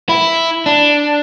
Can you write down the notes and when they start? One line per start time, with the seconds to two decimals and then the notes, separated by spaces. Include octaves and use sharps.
0.09 E4
0.66 D4